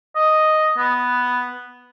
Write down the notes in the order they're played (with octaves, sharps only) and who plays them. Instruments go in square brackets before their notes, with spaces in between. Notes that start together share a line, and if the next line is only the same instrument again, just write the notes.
[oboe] D#5
B3